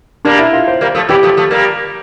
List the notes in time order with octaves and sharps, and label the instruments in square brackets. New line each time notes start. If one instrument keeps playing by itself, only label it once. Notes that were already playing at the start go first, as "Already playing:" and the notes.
[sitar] G3 A#3 [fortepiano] D4
[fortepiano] E4
F4
C5
[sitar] G3 A#3
F3 A3
[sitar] E3 G3 [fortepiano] G4
[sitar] F3 A3
F3 A3
G3 A#3